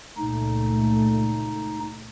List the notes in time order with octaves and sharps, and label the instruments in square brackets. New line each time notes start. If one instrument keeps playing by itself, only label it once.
[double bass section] C#2 A#2 A3 [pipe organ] D#4